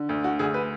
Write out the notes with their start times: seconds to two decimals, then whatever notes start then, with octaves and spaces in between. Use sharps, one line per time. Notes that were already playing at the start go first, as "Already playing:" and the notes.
Already playing: D3
0.09 D2
0.24 F#4
0.39 D2 G#4
0.54 B4